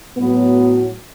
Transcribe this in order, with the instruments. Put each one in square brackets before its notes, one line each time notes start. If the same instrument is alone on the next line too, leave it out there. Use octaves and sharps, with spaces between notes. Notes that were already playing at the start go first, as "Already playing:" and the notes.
[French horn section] A2 F#3 B3